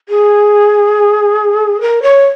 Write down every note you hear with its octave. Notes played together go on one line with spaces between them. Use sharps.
G#4
A#4
C#5